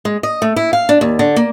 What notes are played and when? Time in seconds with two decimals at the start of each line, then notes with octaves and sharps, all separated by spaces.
0.05 G#3
0.23 D#5
0.42 A3
0.56 E4
0.73 F5
0.89 D4
1.01 D#2
1.19 D3
1.36 A#3